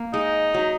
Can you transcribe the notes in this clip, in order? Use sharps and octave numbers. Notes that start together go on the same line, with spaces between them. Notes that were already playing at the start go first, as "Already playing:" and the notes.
Already playing: A#3
G#3 D#4
F#3